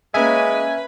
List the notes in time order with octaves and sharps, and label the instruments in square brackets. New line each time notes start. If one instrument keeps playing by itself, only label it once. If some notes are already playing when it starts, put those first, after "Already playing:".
[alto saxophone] G#3 [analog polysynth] A#3 C#4 G#5 [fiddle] B4 [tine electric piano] E5